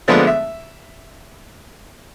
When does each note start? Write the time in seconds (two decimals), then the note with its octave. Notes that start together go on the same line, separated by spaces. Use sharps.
0.08 D3 F3 G#3 A3 B3 D4
0.27 E5